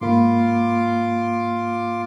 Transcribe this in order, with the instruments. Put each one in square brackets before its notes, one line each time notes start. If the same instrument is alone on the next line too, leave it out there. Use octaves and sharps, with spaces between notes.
[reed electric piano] G#2 A#3 B5 [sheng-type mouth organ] F4 C6 D6